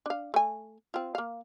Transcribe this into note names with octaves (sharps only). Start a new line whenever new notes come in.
D4 F5
A3 G#5
C4 F4
A#3 F5